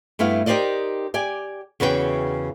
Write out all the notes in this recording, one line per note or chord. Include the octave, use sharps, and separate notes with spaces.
G2 A3 B3 E4 F5
D#4 G4 A#4 C5 D5 D#5
G4 D5 G#5
E2 C#3 F#4 B4 C5 G5